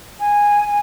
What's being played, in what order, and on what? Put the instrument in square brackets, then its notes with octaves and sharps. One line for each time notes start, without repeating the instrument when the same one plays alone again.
[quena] G#5